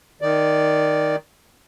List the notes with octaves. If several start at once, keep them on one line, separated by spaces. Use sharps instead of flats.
D#3 D5